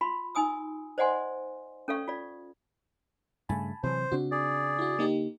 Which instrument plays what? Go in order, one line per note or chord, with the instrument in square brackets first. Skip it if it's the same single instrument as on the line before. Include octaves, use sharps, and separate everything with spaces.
[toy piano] F4 B5 C6
D#4 G#5 D#6 E6
C5 D5 D#5 F#5 G#5 C6
C#4 A4 D5 F5 C#6
F4 D5
[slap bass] G2 C#3 A3 [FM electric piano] G#5 A5 B5
[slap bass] C3 E3 F#3 [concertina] C5
[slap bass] C#3 C4 D4 [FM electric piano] F#4
[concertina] G#4 D5
[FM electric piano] E4 F#4
A#3 D#4 G4